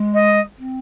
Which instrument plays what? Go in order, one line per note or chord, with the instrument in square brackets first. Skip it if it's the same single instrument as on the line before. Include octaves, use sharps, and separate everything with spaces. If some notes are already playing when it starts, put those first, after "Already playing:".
Already playing: [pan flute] G#3
[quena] D#5
[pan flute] C4